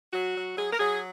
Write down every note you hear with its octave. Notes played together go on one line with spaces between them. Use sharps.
F#3 F#4
F#3
F#3 G#4
A#4
F#3 G#4